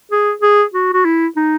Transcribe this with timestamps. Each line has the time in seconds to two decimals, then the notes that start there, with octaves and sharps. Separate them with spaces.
0.11 G#4
0.42 G#4
0.74 F#4
0.93 F#4
1.05 E4
1.36 D#4